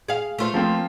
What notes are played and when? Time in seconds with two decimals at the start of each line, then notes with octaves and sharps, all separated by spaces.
0.08 G#4 F5
0.39 A3 F4 C5
0.54 F3 A#3 C4